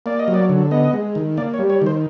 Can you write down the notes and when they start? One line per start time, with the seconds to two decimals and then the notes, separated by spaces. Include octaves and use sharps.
0.06 A#3 D5
0.19 D#5
0.28 F#3
0.34 D5
0.49 D3
0.71 B3 D#5
0.93 G#3
1.15 D#3
1.37 A#3 D5
1.54 C#5
1.59 G3
1.70 C#5
1.82 D#3 C5